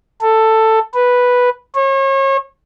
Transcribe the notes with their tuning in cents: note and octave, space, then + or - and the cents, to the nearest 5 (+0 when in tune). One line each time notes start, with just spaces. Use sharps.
A4 +10
B4 -5
C#5 -35